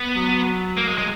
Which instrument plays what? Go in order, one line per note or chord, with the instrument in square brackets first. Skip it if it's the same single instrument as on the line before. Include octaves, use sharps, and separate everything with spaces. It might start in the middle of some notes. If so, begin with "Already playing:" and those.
Already playing: [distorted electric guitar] B3
[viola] F#3
[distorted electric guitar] A#3
G#3
G#3